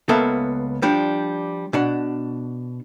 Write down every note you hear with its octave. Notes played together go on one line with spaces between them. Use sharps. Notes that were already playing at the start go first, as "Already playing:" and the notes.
C#2 A#3 B3 A4 E5
F3 G3 D4
B2 D4 F#5